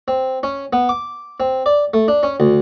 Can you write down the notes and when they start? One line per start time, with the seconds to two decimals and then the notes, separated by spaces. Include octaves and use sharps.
0.08 C4
0.43 C#4
0.73 B3
0.89 D6
1.40 C4
1.66 D5
1.94 A3
2.08 D4
2.23 C#4
2.40 D2